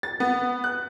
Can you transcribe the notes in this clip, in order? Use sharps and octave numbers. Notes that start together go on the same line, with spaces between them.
A6
B3
F#6